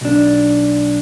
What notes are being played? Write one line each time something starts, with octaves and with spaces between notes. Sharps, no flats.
B1 D4